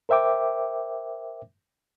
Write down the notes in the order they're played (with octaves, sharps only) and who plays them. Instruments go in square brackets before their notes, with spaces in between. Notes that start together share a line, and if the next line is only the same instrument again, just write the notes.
[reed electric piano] A#4 C5 E5 G5 D6